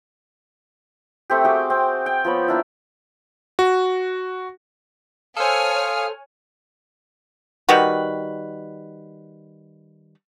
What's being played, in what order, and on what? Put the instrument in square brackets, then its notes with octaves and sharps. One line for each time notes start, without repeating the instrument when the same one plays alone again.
[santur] A3 C4 G4
F#4 G#4 G5 D6
C4
G5
F3 B3 C#5 B5
A#3 D4 E4
[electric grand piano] F#4
[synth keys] A4 C5 [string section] C#5 G#5 F6 [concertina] F5 D#6
[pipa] D#3 G3 F#4 B4